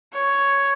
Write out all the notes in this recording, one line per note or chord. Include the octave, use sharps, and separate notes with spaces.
C#5